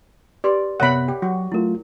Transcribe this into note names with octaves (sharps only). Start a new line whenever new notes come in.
G4 B4 D5 C6
F#2 C3 B3 A#4 C#5 E5 F#5 B5
G4 G5
F#3 F#4
F#3 A3 E4 F4 A#4